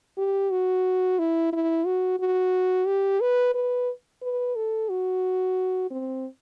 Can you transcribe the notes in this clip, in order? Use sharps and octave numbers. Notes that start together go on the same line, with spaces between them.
G4
F#4
E4
E4
F#4
F#4
G4
B4
B4
B4
A4
F#4
C4